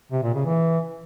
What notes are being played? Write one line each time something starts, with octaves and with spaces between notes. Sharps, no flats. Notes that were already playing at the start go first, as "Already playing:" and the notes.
C3
A#2
C#3
E3